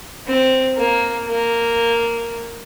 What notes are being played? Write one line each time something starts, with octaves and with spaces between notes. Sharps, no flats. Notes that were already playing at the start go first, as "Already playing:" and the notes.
C4
A#3
A#3